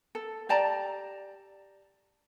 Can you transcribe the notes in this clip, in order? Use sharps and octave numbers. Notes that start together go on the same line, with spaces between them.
A4
G4 D5 A5 A#5